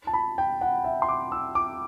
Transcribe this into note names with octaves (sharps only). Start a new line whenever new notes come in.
A5
B5
G5
F#5
E5
C6
D6
E6
D6